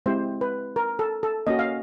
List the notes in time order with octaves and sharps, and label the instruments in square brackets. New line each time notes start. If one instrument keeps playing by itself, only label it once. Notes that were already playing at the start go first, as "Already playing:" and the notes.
[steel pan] G#3 C4 E4 G4 C5
B4
A#4
A4
A4
A#3 C#4 F#4 D#5
F5